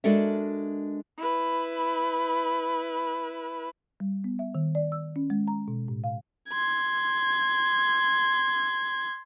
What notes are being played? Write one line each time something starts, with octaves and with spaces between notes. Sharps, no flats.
G#3 D4 F#4 A4 A#4 E5
E4 B4
G3
B3
E5
D#3
D5
E6
C#4
G#3
A#5
B2
A2
F5
C6 G#6